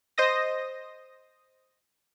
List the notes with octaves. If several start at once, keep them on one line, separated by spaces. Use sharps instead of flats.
C5 D#5 D#6 A#6